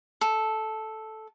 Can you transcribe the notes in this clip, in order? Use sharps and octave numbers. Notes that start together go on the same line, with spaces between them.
A4